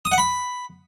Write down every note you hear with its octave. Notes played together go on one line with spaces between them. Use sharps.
D#6
F#5
B5